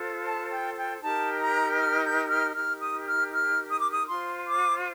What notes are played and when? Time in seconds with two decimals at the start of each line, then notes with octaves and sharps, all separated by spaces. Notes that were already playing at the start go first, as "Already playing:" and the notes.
Already playing: F4 A4 C5
0.25 A5
0.50 G5
0.76 G5
1.01 D#4 G4 A#4 A5
1.40 A#5
1.78 F6
2.04 G6
2.29 F6
2.54 D#4 G4 A#4 F6
2.80 D#6
3.06 F6
3.31 F6
3.69 D#6
3.80 D6
3.92 D#6
4.07 F4 C5 C6
4.46 D6